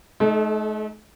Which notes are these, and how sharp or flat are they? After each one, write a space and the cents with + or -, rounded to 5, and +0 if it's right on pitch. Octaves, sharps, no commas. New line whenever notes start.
A3 -45 D#4 +0 A4 -20